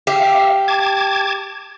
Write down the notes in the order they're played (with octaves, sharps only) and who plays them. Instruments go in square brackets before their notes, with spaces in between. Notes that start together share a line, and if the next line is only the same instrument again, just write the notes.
[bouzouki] G4 [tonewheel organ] E5 F5
[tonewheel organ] A5 D6 G#6